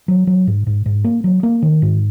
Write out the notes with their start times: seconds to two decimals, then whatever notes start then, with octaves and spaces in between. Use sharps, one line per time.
0.08 F#3
0.27 F#3
0.47 G#2
0.67 G#2
0.86 G#2
1.04 A#3
1.24 F#3
1.43 A#3
1.62 D#3
1.82 G#2